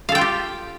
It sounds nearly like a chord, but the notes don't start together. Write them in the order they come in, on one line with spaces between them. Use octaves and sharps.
F5 A4 G5 F4 G4